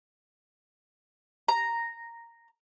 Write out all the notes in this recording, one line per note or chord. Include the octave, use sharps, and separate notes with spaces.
A#5